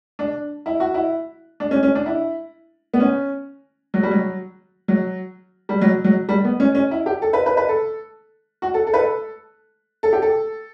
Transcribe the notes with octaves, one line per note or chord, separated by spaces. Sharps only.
D4
E4
F#4
E4
D4
C#4
C#4
D4
E4
B3
C#4
F#3
G3
F#3
F#3
G3
F#3
F#3
G3
B3
C#4
C#4
E4
G4
A4
B4
B4
B4
A4
F#4
A4
A4
B4
A4
A4
G4
A4